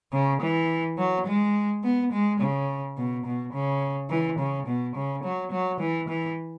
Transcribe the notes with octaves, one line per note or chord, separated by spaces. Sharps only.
C#3
E3
F#3
G#3
B3
G#3
C#3
B2
B2
C#3
E3
C#3
B2
C#3
F#3
F#3
E3
E3